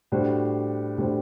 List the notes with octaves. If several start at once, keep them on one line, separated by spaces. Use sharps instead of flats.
A2 G3 D4 F#4 C5
A2 G3 D4 F#4 C5